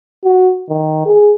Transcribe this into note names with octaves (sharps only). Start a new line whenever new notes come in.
F#4
D#3
G#4